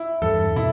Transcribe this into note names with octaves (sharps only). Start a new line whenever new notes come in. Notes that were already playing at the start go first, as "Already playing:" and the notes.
Already playing: E4
E2 G2 A4
B2 E4